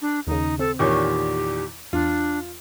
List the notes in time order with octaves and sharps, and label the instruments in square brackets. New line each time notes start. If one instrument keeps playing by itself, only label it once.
[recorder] D4
[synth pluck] D#2 C#3 [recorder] D#4
[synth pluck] C4 [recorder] A4
[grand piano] E2 A#2 D#3 [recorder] G4 [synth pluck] C#5 C#6
[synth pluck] E2 [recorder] D4 [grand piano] F4